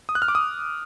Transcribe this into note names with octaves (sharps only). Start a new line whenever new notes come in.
D#6
F#6
F6
D6
D#6